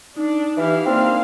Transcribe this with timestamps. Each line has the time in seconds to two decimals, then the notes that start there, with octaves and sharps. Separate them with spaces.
0.17 D4 D#4
0.57 E3 E4 G4 F5
0.86 A#3 C4 D4 F5